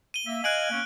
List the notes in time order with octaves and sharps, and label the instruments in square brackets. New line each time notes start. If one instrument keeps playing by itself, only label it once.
[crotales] D#7 G7
[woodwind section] A#3 E5
[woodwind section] D#5 F5 G#5 [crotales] F#6 D7 F#7
[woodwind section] A#3 B3 C#4